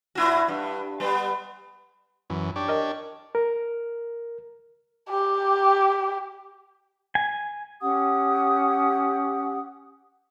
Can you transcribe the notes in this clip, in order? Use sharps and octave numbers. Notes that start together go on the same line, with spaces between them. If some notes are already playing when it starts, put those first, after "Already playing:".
A2 E4 F#4
G2
G3 B3
F#2 E3
D4 G4 C#5
A#4 D#5
A#4
G4
G#5
C#4 G4 F#5 D#6